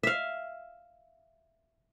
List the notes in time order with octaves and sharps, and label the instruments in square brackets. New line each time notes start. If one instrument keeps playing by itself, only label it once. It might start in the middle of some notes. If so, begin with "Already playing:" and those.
[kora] E5 F5